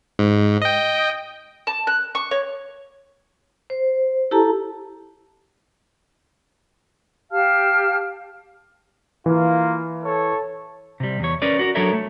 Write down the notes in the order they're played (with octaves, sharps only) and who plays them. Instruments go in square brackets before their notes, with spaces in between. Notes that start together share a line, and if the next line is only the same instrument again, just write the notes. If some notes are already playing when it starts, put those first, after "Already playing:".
[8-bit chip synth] G#2
D#5 G5
[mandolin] A5
F#6
C#6
C#5
[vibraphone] C5
E4 G4 A4 A5 A#5
[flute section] G4 F5 A5 F6
[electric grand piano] E3 [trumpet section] A#3 F4
[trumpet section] A4 C#5
[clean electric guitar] C3 G3
E2 C#5
C#4 A#4 B4 D5
F#4 A#4
F#3 D4 A4 A#4 C#5 E5
A3